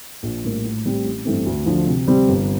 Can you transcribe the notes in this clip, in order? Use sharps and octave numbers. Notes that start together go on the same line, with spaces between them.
A#1
A2 G3 A#3
A2
G3 C4 G4
A1
G2 E3 A3 C4
D2
D3 F3
C3
G3 C4 G4
G1